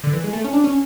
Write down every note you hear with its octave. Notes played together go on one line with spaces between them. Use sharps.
D3
E3
G#3
A3
C#4
D4
C#4